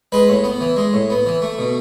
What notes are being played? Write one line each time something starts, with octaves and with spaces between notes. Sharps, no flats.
G#3 B4
A2
B3
E3
G#3
A2
B3
E3
A3
B2